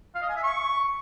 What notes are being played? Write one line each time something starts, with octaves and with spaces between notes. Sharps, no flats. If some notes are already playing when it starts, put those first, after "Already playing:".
F5
D#5
G#5
E5
C#6